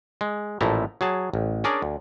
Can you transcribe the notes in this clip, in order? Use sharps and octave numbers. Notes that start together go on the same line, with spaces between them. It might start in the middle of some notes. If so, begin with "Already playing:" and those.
G#3
A1 A#2 F3 A3 E4 A#5
F#3 G#4 A5
A1
C#4 D4 G#4 A#4 D5
D2